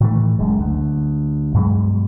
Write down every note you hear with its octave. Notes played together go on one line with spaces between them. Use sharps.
A2 D#3 E3 A3
F#1 F#2 G#3
D2
G2 B2 F#3 G#3